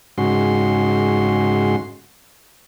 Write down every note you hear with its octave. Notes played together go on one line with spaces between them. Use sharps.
G#2 C#3 F#4 C6